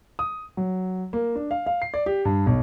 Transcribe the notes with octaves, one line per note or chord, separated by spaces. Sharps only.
D#6
F#3
A#3
D4
F5
F5
C7
D5
G4
G2
B1